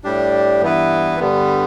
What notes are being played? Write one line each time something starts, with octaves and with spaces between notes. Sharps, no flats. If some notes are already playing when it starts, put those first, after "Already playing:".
A2 G3 D4 G4
G2 E3 B3 E4 B4
G2 D3 G3 B3